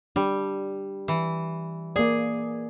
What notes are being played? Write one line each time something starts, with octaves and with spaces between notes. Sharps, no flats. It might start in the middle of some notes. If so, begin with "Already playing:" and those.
G3 D4
E3
A#3 G#4 D5